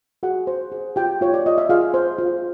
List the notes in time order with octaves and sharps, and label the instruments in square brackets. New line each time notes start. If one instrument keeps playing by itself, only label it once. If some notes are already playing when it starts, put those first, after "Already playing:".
[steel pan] F#4 G#4 F#5
C5
G#4
F4 G4 G5
F4 C#5
D5
F4 D#5
E5
F4 G#4 F5
C5
F4